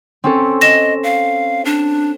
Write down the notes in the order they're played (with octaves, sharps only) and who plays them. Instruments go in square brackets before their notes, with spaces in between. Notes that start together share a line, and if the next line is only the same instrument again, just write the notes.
[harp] C4 C#4 A4
[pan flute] D#5 [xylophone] A#6 E7
[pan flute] F5
D4